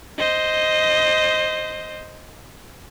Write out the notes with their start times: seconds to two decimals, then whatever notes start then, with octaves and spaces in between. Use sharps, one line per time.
0.18 C5 D#5